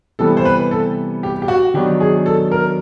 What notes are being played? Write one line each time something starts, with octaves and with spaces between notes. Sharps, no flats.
C3 E3 G3 B3 A4
C5
B4
A4
G4
G4
F#4
D#3 F#3 B3 D4 G4
G#4
A4
A#4